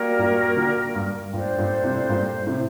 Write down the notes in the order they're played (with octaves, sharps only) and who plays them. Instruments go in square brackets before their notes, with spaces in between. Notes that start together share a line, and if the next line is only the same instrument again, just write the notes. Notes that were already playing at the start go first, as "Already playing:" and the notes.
Already playing: [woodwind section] G3 A#3 F#4 A#4
[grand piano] G2 A#2
A#2 D3
G2
[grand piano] G2 A#2 [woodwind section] G3 D4 A4 C5
[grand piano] G2 A#2
A2 C3
G2 A#2
A2 C3